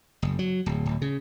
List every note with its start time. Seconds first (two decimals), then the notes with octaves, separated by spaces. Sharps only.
0.22 F#1
0.39 F#3
0.66 D1
0.86 D1
1.02 C#3